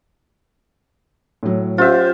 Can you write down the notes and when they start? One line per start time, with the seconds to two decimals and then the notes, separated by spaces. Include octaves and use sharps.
1.43 A2 F#3
1.78 C#4 F4 G4 C5 E5 F#5